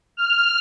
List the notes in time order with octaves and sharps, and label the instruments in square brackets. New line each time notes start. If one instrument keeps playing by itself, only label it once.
[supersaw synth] F6